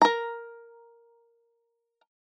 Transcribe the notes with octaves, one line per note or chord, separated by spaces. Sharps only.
A#4 A#5